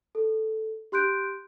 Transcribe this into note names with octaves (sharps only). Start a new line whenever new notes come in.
A4
G4 C6 F#6 G6 D7